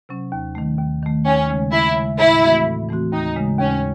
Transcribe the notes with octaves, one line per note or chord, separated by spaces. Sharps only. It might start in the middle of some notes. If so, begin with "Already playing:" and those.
C3 F#3 C#4
D#2
D#3 A3
D#2
D#3 A3
D#2 C#4
C#3 G#3
D#2 E4
C#3 G#3
A2 E4
E3 A3 C4 F#4
A2
E3 A3 C4 F#4
D#2 D#4
C#3 G#3
D#2 C#4